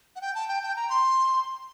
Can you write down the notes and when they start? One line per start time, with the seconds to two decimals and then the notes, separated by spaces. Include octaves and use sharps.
0.16 F#5
0.21 G5
0.35 A5
0.48 G5
0.63 G5
0.76 A#5
0.89 C6